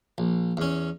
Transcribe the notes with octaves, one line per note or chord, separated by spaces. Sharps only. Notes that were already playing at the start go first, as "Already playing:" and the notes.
A#1
E2 C#4